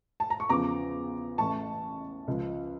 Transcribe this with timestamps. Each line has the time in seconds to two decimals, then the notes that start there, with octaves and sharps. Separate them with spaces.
0.20 A5
0.30 A#5
0.40 C#6
0.49 E2 C#3 F3 A#5 D6
1.38 A1 A2 E3 A5 C#6
2.28 C#2 C#3 F3